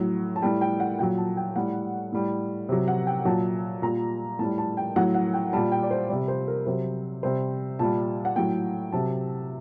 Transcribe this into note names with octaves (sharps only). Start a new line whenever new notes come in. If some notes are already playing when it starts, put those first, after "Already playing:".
Already playing: A2 F#3
A5
A2 G3 G5
G5
F#5
A#2 F#3 G5
A5
G5
A2 G3 F#5
A2 G3
C3 F#3
F#5
G5
A#2 F#3 A5
A#2 G3 A#5
A2 G3 A5
A5
G5
A2 F#3 F#5
F#5
G5
A#2 G3 A5
G5
D5
C5
C3 G3 D5
C5
A#4
C3 F#3 C5
C3 G3 C5
A#2 G3 A5
F#5
A2 F#3 G5
C3 F#3 A5